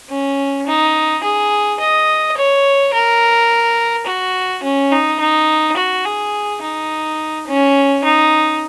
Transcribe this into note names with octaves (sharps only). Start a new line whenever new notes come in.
C#4
D#4
G#4
D#5
C#5
A#4
F#4
C#4
D#4
D#4
F#4
G#4
D#4
C#4
D#4